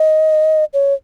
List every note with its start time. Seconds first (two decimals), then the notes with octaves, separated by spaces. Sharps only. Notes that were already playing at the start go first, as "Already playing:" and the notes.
Already playing: D#5
0.74 C#5